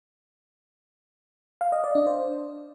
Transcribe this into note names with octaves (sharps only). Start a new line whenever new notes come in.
F5
D#5
D5
D4
C5